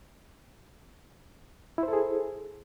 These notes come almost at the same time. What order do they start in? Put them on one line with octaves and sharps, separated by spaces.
E4 C5 A4 G#4